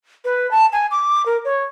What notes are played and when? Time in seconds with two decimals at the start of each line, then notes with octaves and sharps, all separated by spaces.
0.25 B4
0.51 A5
0.73 G#5
0.91 D6
1.26 A#4
1.45 C#5